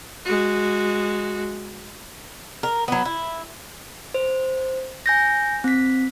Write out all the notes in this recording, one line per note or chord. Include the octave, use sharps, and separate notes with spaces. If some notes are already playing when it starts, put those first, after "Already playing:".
G#3 F#4
A#4
F#3 B3
E4
C5
G#5 G6 A#6
C4 B6